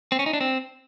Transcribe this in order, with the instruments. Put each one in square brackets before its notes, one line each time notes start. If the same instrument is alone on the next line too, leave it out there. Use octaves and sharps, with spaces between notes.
[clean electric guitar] C4
C#4
D#4
D4
C4